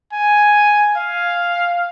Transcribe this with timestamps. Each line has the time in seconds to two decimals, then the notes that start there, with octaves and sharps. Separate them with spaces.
0.13 G#5
0.97 F5